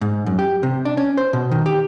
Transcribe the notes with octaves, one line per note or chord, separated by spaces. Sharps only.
G#2
F#2
G4
C3
D4
C#4
C5
B2
D#3
G4